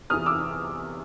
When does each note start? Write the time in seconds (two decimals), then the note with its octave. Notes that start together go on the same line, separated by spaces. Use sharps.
0.10 E2 C3 E3 D#6 F6
0.26 D6 E6